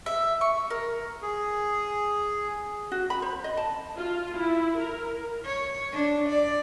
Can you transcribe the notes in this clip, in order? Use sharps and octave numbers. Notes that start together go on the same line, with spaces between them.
E5
C#6
A#4
G#4
F#4
B5
C5
D#5
A5
F4
E4
A#4
C#5
D4
D5